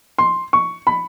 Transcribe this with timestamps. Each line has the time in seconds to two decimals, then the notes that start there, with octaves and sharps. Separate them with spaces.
0.18 C6
0.53 C#6
0.87 B5